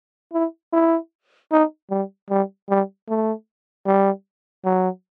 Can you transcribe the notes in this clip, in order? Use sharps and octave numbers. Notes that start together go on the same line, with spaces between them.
E4
E4
D#4
G3
G3
G3
A3
G3
F#3